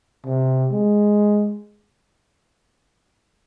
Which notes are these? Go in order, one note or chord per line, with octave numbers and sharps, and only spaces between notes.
C3
G#3